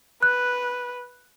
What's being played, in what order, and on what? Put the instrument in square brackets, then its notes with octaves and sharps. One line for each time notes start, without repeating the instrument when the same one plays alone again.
[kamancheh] B4 [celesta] F#6